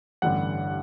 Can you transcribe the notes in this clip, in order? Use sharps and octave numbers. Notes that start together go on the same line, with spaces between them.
A1 G2 D3 G3 F#5